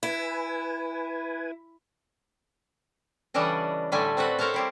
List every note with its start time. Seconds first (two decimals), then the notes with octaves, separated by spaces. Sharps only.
0.03 E4 B4 G#5
3.34 C#3 E3 G3 D4 A4 D#5
3.92 A2 D3 G3 A3 A4 G#5
4.17 C4 F#4 A4 B4
4.39 A4 A#4 C5 C#5 F5 A5
4.54 G3 C4 E4